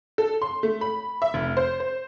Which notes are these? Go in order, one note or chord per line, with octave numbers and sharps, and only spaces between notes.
A4
C6
A3
B5
E5
F1
C5
C5